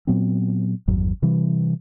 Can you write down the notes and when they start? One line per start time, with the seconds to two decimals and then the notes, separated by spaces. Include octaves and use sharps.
0.07 A#2 F#3 B3 C4
0.88 G#1 E2 G2 F#3
1.22 C3 E3 G3